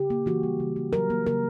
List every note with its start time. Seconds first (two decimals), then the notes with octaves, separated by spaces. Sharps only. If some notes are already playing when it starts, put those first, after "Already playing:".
Already playing: C#3 G4
0.10 A#3
0.26 E3 F#4
0.43 G3
0.60 C#3
0.76 A#3
0.93 F#3 A#4
1.10 A#3
1.26 C#3 A#4